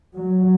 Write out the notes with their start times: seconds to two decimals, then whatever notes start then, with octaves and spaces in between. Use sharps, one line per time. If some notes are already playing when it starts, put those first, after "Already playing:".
0.17 F#3